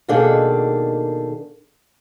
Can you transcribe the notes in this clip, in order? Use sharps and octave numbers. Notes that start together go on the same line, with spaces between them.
B2 D#3 A#3 D4 G#4 A4